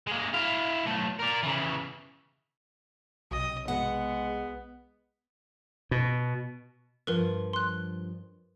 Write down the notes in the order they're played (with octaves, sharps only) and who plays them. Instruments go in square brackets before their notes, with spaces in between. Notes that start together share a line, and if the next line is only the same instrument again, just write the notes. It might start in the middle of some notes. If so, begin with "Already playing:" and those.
[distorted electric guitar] G#3 A#3
E4 F5
B1 A3
A#4 D5
C#3 E3
[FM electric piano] B1 C3 [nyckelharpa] D#5
[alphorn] G#3 [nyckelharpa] B3 [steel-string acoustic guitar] F#5
[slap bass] B2
[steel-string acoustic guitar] G2 F3 [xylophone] A#4 B4
[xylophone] C6 F#6